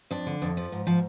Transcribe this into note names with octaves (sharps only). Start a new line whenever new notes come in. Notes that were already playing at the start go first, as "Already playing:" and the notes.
F2 D4
D3
F2
F3
G#2
F3